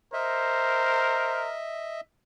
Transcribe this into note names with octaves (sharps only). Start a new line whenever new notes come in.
A#4 C5 D#5 E5